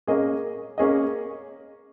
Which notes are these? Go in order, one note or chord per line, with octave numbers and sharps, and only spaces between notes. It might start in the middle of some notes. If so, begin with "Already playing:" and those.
A#3 C#4 G#4 D#5
A#3 C#4 G#4 D#5